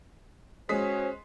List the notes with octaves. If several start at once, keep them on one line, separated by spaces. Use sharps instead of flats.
G#3 C#4 F#4 C5 D#6 B6